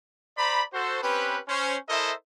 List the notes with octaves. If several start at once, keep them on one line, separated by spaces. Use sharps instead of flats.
C5 D5 A#5 B5
F#4 A4 C5
C4 C#4 G4 B4
C#4 C5
E4 A4 A#4 C5 D#5 E5